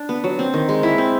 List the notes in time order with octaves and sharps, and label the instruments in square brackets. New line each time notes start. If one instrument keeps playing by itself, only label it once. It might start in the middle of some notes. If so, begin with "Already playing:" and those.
Already playing: [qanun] D4
B3
F#3
C4
D#3
G#3
E4
C4